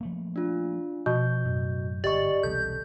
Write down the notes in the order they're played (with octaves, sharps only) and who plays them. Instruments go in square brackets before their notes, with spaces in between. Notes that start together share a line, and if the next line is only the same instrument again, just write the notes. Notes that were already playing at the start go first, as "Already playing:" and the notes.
[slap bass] F3 A3 A#3
[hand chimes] D4 F4
[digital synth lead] B2 [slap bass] F3 [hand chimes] G6
[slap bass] F#2 A2
[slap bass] G1 G#2 [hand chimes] G4 D#5 C#6 [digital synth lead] D5
[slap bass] E1 C2 [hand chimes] A4 [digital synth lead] G6